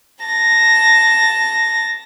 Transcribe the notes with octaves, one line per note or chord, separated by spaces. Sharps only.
A5 A#6